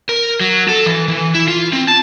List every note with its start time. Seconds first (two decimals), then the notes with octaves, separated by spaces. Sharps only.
0.09 A#4
0.41 F#3
0.69 A4
0.86 E3
1.08 E3
1.35 E4
1.48 F4
1.73 C4
1.88 A5